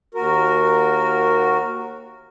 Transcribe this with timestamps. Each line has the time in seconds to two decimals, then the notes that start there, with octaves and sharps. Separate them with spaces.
0.14 D#2 F#4 A#4